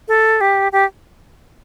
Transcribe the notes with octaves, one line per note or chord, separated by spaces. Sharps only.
A4
G4
G4